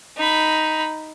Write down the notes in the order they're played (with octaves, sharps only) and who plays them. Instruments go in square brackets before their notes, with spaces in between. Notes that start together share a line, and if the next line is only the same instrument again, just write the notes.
[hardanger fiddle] D#4 B5